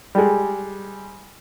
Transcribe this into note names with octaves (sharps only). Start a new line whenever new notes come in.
G3 G#3